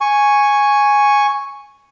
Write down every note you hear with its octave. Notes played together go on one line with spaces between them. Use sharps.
G#5 C#6